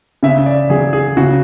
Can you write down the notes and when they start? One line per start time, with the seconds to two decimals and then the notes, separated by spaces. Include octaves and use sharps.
0.23 C#3 E5
0.46 D5
0.70 F#3 G#4
0.93 G#4
1.17 C#3 F#4